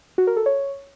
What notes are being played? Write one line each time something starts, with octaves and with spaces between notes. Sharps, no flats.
F#4
A#4
A4
C#5